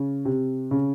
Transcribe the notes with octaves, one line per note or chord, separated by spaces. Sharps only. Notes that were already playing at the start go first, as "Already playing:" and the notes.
Already playing: C#3
C3
C#3